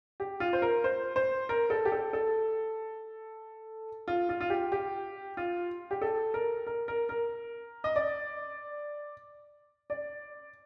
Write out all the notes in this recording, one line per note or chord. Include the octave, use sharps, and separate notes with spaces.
G4
F4
C5
A#4
C5
C5
A#4
A4
G4
A4
A4
F4
F4
F4
G4
G4
F4
G4
A4
A#4
A#4
A#4
A#4
D#5
D5
D5